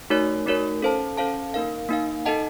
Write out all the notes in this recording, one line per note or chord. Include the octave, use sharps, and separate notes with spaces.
A3 D#4 F#4 A#4 C#5
A3 D#4 F#4 A#4 C#5
C#4 A4 C5 F5 A5
C#4 A4 C5 F5 A5
A#3 D#4 A#4 F5
A#3 D#4 A#4 F5
D#4 A4 D#5 F#5 A5